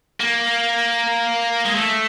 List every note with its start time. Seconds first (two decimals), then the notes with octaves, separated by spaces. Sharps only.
0.20 A#3
1.65 G#3
1.75 A3